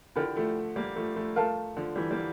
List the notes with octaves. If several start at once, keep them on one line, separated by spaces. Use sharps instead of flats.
D3 F3 E4 G4 A#4 D5
F3 A3
G3 A#3
F3 A3
F3 A3
F3 A3 A#4 F5 A5
D3 F3
E3 G3
G3 A#3